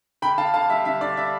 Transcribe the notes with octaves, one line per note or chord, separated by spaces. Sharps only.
D3 G5 B5
D3 F5 A5
D3 F5 A5
G3 E5
D3 E5
D3 D5
D4 E5